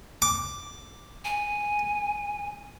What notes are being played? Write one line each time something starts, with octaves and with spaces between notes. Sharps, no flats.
D6
G#5